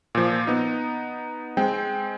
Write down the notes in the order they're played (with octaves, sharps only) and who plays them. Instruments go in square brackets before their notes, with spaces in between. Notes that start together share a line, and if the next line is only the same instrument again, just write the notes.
[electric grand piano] A#2 F3
B3 D#4
G#3 C4 G5